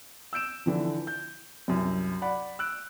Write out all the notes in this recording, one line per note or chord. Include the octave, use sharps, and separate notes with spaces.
E6 G6 D7 E7
D3 E3 F3
G6
C2 F#2
D5 F#5 B5
E6 F#6 D7